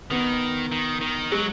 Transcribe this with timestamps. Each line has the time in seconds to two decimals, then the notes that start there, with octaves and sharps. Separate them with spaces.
0.11 D#3 B3
0.72 D#3
1.01 D#3
1.32 F#3 G#3